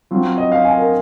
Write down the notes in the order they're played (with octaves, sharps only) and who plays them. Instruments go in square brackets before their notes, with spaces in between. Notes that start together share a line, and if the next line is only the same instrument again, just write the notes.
[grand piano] F#3 C4 F4
D#5
F5
G#5
A#4